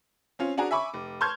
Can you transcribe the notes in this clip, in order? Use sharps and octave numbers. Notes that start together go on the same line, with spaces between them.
C4 C#4 F4
D4 F#4 G#4 G#5 A#5
E5 G#5 B5 C#6 D6
F1
A5 C6 C#6 F6 G6 G#6